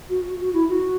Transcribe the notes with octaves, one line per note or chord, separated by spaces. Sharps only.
F#4
F#4
F#4
E4
F#4